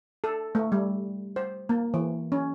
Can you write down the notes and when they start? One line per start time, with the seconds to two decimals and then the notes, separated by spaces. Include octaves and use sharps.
0.24 A4
0.55 A3
0.72 G3
1.36 C5
1.69 A#3
1.94 E3
2.32 C#4